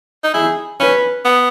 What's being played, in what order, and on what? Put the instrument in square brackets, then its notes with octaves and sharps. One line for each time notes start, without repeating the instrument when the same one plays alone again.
[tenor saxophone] D#4
[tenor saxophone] E4 [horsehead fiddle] G#4
[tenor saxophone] C#4 [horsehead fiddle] B4
[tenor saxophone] B3